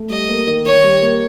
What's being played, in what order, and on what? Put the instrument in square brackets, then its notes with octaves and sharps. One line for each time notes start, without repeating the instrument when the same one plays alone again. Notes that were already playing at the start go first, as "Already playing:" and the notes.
Already playing: [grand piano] A3
[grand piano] G3 [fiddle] D#5
[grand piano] A#3
D#3
[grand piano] D#3 [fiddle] C#5
[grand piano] G3
A#3